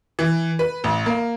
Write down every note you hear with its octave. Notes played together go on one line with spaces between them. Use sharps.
E3
B4
A1
A#3